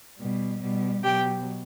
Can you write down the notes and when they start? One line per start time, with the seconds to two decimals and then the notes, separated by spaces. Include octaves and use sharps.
0.18 B2 G3
0.60 B2 G3
1.03 B2 F#3 G4 G5